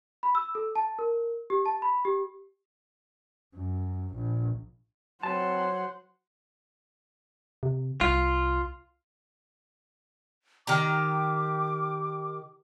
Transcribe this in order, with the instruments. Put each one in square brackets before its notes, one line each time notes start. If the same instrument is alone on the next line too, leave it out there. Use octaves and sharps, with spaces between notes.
[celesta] B5
E6
A4
A5
A#4
G4
A5
B5
G4
[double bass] F#2
A#1
[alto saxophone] F#3 [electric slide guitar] C4 B4 A5 [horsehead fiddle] C5 F#5
[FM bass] C3
[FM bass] C2 [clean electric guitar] F4
[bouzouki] D#3 G4 A#5 [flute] D6